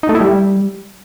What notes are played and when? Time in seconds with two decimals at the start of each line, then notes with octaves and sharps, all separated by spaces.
0.03 D#4
0.09 A3
0.15 E4
0.21 G3